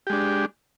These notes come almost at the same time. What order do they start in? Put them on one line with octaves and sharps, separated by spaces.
G4 G#3 D4